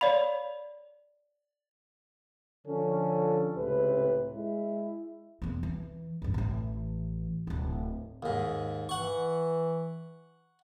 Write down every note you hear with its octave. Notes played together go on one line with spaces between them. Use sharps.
C#5 D5 F5 B5
D3 F3 C#4 A4
C#2 A2 C3 B4
G#3 E4
E2 A#3
E3
G1 C#2
A1 E3
D1 E4
D#2 G#2
E3 F#5 C#6